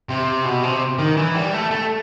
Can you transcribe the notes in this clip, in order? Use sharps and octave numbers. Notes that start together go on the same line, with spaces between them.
C3
B2
C3
D#3
E3
G3
A3
A3